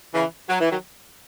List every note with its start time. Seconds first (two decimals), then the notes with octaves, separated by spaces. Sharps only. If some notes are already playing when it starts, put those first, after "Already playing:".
0.14 C#3 E3
0.50 F#3
0.61 E3
0.72 D#3 F#3